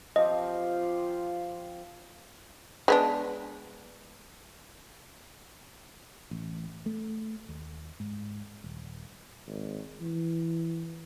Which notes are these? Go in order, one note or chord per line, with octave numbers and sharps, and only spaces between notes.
F3 C4 F4 G4 D#5 F5
G#3 B3 D4
A1
A3
D#2
G#2
D#1
G#1
E3